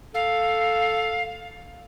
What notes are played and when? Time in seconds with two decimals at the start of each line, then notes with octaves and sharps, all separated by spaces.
0.14 A4 F5